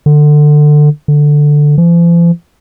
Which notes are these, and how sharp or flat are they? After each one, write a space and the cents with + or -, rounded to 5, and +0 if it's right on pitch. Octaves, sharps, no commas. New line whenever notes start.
D3 +20
D3 +5
F3 -45